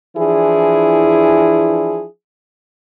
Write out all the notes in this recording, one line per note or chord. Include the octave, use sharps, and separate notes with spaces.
E3 F3 D4 E4 G#4